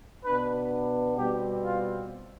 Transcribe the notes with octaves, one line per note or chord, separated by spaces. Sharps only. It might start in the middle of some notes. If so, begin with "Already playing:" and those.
B2 B3 D4 B4
B2 G3 C4 G4
F4